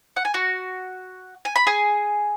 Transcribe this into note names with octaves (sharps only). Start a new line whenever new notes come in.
F#5
G#5
F#4 F#5
G#5
B5
G#4 G#5